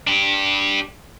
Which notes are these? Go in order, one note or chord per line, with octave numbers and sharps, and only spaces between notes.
D4 G4